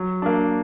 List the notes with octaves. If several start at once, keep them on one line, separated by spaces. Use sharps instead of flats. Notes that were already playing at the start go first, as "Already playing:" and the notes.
Already playing: F#3
A#3 D4